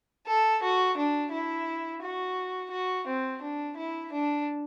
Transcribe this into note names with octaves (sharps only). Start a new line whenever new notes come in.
A4
F#4
D4
E4
F#4
F#4
C4
D4
E4
D4